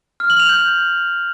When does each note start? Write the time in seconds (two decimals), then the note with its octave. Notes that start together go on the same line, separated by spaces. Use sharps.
0.20 F6
0.30 F#7
0.40 F7
0.49 G6